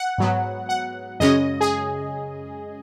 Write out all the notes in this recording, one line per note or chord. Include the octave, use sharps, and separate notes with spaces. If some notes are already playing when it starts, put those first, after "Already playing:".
Already playing: F#5
G#2 F#3 B3
F#5
F#2 C#3 G#3 C#4 D#5
G#4